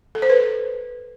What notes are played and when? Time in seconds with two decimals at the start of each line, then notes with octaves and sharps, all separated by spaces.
0.15 A4
0.22 C5
0.29 B4